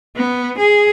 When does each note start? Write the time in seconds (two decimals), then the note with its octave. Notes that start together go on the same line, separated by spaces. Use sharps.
0.17 B3
0.58 G#4